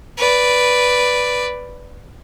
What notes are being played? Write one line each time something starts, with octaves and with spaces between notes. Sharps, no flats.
B4 D5